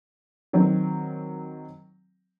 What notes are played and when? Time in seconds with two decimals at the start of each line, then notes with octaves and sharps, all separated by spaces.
0.53 D#3 F#3 C4